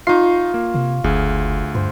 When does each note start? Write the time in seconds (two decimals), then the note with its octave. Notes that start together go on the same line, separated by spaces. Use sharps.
0.07 D#4 F4 C#6 C7
0.54 A#3
0.74 C3
1.04 F#1 D2 G#4
1.75 G2 C5